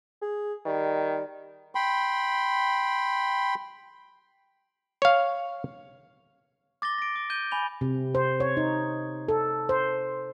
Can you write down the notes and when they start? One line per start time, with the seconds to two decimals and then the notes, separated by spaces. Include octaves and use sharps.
0.22 G#4
0.66 D#3 G3
1.75 G5 B5 C6
5.02 C#5 F5
6.82 D6 A6 A#6 G7
6.98 A#6 D7
7.16 D6
7.30 G6 D#7 G7
7.51 G#5 B5 F7 G7
7.81 C3
8.15 C5
8.40 C#5
8.57 D#4
9.28 A4
9.69 C5